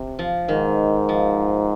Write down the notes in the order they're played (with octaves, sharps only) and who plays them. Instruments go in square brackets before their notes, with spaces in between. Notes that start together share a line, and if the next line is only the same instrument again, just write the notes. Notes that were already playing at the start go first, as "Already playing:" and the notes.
Already playing: [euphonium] C3
[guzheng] F3
[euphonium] G#2 [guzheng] D#3
[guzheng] F3